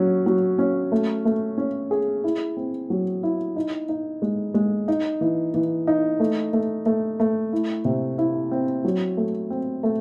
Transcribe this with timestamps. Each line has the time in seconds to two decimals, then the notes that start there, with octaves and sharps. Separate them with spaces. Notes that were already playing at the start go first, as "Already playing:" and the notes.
Already playing: F#3 C#4
0.26 F#3
0.59 C#4
0.92 A3
1.25 A3
1.58 C#4
1.91 G#4
2.24 E4
2.57 C4
2.90 F#3
3.23 E4
3.56 D#4
3.89 D#4
4.22 G#3
4.54 G#3
4.88 D#4
5.21 E3
5.54 E3
5.87 D#4
6.20 A3
6.53 A3
6.86 A3
7.20 A3
7.53 E4
7.85 C3
8.18 E4
8.51 C4
8.85 F#3
9.17 A3
9.50 C4
9.83 A3